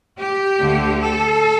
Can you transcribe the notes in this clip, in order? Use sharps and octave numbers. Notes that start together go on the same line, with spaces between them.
G4
D2 D3 A3
A4